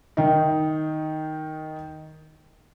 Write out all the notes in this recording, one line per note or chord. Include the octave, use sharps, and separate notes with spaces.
D#3 D#4